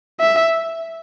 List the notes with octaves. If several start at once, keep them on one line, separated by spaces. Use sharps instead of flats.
E5